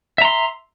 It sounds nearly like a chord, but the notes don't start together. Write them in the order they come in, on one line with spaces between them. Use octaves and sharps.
E5 A#5 C6